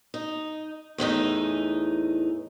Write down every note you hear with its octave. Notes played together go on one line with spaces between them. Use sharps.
D#4
E2 A2 E3 D#4